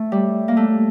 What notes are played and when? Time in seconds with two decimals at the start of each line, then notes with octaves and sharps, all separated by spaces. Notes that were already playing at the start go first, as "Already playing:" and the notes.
Already playing: A3
0.12 G3
0.48 A#3
0.57 A3